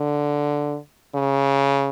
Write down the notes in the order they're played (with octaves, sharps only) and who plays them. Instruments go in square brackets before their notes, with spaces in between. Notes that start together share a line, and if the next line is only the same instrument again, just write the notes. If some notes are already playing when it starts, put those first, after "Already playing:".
Already playing: [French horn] D3
C#3